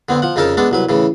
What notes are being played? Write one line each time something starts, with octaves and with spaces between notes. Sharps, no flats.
D3 B3 C4
F3 F#5
F2 C#3 D#4 A4 A#4 A5
G#3 B3 D4 A4
C2 F#3 B4
A2 C#3 E3